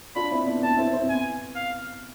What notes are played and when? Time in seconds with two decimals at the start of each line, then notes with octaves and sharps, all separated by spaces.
0.15 D4 F4 B5
0.31 C4 E4
0.47 B3 D4
0.62 B3 D4 A5
0.77 C4 E4
0.93 C4 E4
1.09 B3 G#5
1.56 F5